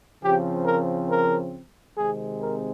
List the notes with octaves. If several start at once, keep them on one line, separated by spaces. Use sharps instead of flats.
C#3 F3 C4 G4
A#4
A#4
C3 D#3 G#3 C4 G#4
A#4